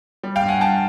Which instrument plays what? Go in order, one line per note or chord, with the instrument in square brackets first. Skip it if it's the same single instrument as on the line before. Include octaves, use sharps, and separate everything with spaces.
[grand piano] G3
F5 G5
G2
F#5 G#5
G2 G5 A5